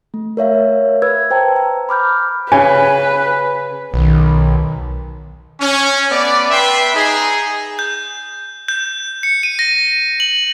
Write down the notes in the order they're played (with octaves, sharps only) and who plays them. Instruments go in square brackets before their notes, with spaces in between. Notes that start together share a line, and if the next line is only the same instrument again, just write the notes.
[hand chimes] A3
A#4 C#5 E5 F5
B4 E6 G#6
C5 G5 A5 A#5
A#5
B5 D6 F6 G6
[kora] C#3 [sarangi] B4 [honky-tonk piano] G#5
[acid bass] B1 [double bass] D#3
[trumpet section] C#4
A3 B3 D5
B4 E5 G5 C6
D#4 G#4
[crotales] G6
G6
C#7
D#7
A#6
F#7